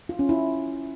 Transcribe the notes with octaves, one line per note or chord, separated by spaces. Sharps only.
F4
C#4
E4